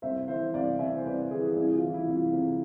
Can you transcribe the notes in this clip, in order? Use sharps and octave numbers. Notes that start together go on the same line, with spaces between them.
C2 C5 E5
E3 C5 E5
C2 D5 F5
C3 E5 G#5
C5
C2 B4 D5
E3 G#4 B4
C2 E4 G#4
F4
E3
E4
C2
F4
C3